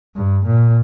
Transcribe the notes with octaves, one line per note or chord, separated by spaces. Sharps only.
G2
A#2